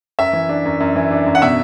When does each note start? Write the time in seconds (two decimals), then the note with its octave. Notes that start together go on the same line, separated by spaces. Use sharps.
0.19 F#2 E5
0.33 E3
0.49 D4
0.65 F#2
0.80 F#2
0.96 E3
1.11 D4
1.26 F#2
1.35 F#5
1.42 B2 E5